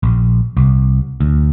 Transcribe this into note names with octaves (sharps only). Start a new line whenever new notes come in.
A#1
C2
D2